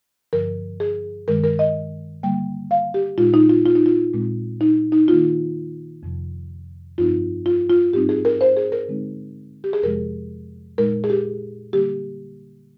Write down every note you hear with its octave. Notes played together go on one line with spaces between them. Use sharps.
G2 D3 F3 A#4
G#4
G2 D#3 G#3 A#4
A#4
D#5
D3 G3 A#3 G5
F5
G4
A#2 G#3 D#4 F4
D#4
F4
F4
D#4
F4
A#2 G#3 C4 D#4
D#4
D#4
D#3 A#3 D#4 F4
F2 C3 F3
G2 F3 C4 D#4 F4
F4
F4
G#2 G3 C4 D#4 G4
G#4
A#4
C5
G#4
A#4
D3 G#3 C4 D#4
G4
G#4
F2 C3 F3 G#3 A#4
A#2 G#3 D#4 A#4
G#4
G4
D3 G3 A#3 G4